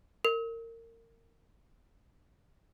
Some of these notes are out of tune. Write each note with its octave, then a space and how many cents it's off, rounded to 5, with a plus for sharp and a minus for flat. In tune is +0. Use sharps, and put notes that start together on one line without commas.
A#4 -30